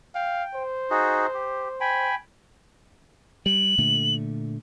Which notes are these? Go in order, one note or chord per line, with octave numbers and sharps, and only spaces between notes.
F5 G5
C5
D#4 F#4 G#4
G4
G5 G#5 B5
G3 F#7
A#2 D3 A3